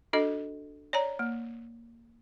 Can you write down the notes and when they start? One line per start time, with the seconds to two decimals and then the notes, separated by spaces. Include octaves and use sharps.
0.13 D4 F#4 A4 D#5
0.93 C#5 D5 A#5
1.19 A#3